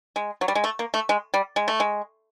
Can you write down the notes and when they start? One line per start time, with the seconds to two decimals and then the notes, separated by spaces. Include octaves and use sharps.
0.16 G#3
0.41 F#3
0.48 G3
0.55 G#3
0.64 A3
0.79 A#3
0.94 A3
1.09 G#3
1.34 G3
1.56 G#3
1.68 A3
1.80 G#3